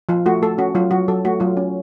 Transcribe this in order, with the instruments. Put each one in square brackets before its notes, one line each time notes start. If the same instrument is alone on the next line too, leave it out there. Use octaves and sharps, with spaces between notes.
[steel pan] F3 F4
A3 F#4
A3 A4
C#4 F#4
F#3 F4
F#3 F#4
F#3 A4
A3 F#4
F#3 F4
C#4